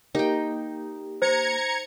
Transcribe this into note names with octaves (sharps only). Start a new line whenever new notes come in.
A#3 D#4 G4 G5
C5 A#5 G#6 C#7